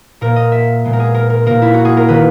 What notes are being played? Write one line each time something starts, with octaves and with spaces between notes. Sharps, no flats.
A#2 A#3 A#4
D#5
E5
A#2 G#3 B3
A#4
G#4
A#4
A#4
A#2 A#3 A#4
E4
F#4
G#4
A#4
D#3 A#3 B4